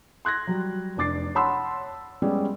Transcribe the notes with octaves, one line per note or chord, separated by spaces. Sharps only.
C6 F#6 G#6 A#6
F#3 G3
F1 D4 D6 A6 C7
C#5 F#5 A5 B5 C6 E6
G3 G#3 B3 C#4 D5